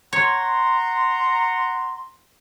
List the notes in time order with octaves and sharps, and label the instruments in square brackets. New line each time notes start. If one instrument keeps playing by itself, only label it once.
[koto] C#5 [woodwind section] F#5 A#5 C6